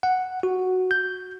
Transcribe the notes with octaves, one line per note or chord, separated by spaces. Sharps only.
F#5
F#4
G6